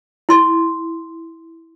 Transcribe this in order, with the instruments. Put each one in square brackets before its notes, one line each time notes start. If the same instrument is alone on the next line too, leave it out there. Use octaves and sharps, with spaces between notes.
[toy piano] E4 C6